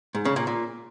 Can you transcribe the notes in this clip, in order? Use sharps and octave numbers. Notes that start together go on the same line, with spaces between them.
G#2
C#3
A#2
A#2